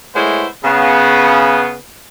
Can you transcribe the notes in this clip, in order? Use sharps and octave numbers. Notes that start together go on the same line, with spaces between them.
G#3 A3 B3 E4 C5 C#5
C#3 B3